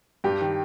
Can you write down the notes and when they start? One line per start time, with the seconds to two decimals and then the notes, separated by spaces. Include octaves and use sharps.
0.24 G2 G4
0.41 D#3